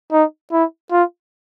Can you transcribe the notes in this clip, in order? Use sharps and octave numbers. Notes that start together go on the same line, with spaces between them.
D#4
E4
F4